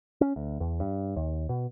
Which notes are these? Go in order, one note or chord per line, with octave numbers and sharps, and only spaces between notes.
C#4
D2
E2
G2
D#2
B2